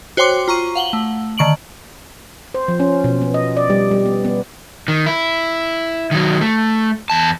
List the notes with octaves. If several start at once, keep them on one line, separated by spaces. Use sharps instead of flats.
F#4 C5 C#5 G5 C6 D6
F4 A#5 C#6 D#7
F5 F#5 F#7 G7
A3
D3 D#3 C#6 D7 F#7
C5
F3
C#4
B2
B3
D#5
D5
G3
G3
B3
B3
D#3
E4
D#3 F#3
A3
E2 A5